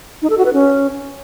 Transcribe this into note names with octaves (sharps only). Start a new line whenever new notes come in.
D#4
A4
F#4
B4
C#4